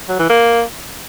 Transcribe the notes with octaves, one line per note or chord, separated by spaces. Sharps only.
F#3
E3
A#3